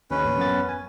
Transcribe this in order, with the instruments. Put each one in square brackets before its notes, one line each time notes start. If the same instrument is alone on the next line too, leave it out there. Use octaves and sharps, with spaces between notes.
[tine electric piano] D#2 D3 [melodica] C#4 B4
[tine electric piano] A1
F#2 B3 A6
G#5